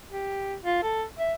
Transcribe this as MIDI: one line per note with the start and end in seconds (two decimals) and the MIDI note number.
0.11 0.56 67
0.63 0.81 65
0.83 1.04 69
1.19 1.33 76